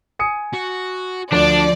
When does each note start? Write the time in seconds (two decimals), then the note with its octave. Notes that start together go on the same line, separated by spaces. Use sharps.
0.19 G#5 D#6 C#7
0.54 F#4
1.32 D2 F3 D4 D5